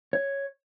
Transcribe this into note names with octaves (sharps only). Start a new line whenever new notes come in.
C#5